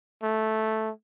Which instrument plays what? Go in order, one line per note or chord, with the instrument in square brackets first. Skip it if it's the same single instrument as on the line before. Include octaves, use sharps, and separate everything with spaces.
[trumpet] A3